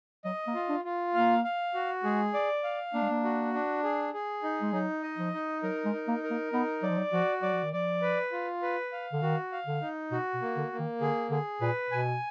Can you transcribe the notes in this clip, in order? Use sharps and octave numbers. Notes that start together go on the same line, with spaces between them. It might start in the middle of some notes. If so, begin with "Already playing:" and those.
F#3 D#5
A#3
F4
D4
F4
A#3 F5
F5
F#4
G#3 G#4
D5
F5
A#3 D4
G#3
A#3
F#4
D4
G#4
G#4
D#4
G#3
F#3 D#4
D#5
F3
D#4
F#3 A#4
G#3
D#4
A#3
A#4
A#3
B3 D#4
F#3 D5
F3
F#3
F3 F#4
F#3 D5
F3
D#3
F3 D5
B4
F4
B4
F5
D3
D#3 F#4
F5
D3
D#4
B2 F#4
B2
A#3
D3
A#3
D#3
D3 G#4
D3 G#4
A#2 B4
B2 G#5